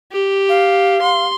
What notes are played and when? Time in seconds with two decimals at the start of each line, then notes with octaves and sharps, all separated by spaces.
0.12 G4
0.49 F5
1.02 C6